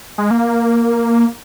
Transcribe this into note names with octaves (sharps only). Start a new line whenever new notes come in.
G#3
A#3